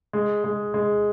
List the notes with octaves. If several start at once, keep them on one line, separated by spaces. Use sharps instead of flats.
G#3
G#3
G#3